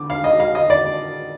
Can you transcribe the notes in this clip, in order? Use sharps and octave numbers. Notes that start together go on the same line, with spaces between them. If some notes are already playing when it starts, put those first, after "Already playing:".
Already playing: D3 D6
F5
D#5
F5
D#5
D5